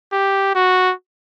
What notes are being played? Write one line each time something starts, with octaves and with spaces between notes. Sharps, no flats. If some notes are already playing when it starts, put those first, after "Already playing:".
G4
F#4